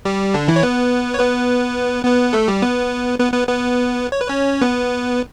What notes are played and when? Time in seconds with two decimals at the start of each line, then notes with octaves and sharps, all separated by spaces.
0.05 G3 G4
0.34 D3 D4
0.48 E3 E4
0.56 C#5
0.63 B3 B4
1.14 C#5
1.19 B3 B4
2.05 B3 B4
2.33 A3 A4
2.48 G3 G4
2.62 B3 B4
3.19 B3 B4
3.33 B3 B4
3.48 B3 B4
4.12 C#5
4.20 B4
4.28 C#4 C#5
4.62 B3 B4